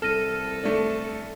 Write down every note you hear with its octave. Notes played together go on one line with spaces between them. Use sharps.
C2 A4 F6 A#6 D#7
A3 D4